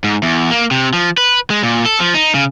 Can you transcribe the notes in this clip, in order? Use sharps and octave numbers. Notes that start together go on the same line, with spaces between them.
G#2
E2
A#3
C3
F3
B4
G#3
A#2
A4
F3
D#4
C#3